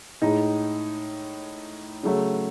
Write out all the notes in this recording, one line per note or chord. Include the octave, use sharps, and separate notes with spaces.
A2 G#3 D#4
C#3 F#3 A3